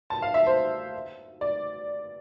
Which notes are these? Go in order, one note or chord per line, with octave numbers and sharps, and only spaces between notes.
A5
F5
E5
C5
D5